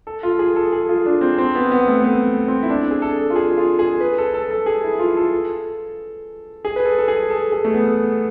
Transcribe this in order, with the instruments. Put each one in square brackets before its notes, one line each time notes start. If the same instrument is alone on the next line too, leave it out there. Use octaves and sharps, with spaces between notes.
[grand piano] A4
F4
G#4
A4
G#4
F4
D4
C4
C4
B3
B3
A3
B3
C4
E4
D4
G#4
A4
F4
G#4
F4
G#4
B4
A4
A4
A4
G#4
E4
F4
A4
G#4
B4
A4
A4
G#4
A4
G#4
A3
B3